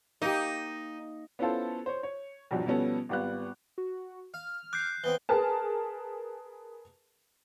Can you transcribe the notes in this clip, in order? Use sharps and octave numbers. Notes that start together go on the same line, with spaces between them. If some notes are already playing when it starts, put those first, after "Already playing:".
A#3 D#4 G4
B3 C#4 E4 F4 A4 C5
C5 C#5
C#5
B1 E2 G2 F3 F#3
B2 F3 G3 B3 C#4 A4
G#1 G3 B3 F4 F#6
F#4
F5 F6
D6 F#6 G6 C7
E3 B3 C4 G7
G#4 A#4 B4 A5